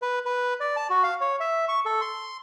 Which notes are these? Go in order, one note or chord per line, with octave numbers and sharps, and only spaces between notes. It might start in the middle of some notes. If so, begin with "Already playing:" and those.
B4
B4
D5
A5
F#4
F5
C#5
E5
C#6
A4
C6